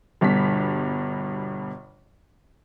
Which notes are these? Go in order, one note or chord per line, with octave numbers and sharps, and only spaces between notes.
G1 G2 B2 B6